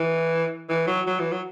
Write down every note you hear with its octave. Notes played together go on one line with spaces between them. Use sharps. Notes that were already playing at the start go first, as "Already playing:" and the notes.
Already playing: E3
E3
F#3
F#3
E3
F#3